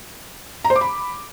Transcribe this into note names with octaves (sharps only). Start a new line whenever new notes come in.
A#5
C5
D6
B5